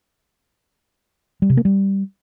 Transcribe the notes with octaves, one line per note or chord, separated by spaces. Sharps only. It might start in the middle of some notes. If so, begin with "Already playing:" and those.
G3
C3
A#3
G3